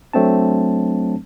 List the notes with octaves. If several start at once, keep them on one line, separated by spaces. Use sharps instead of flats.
F#3 A3 C4 D4 A5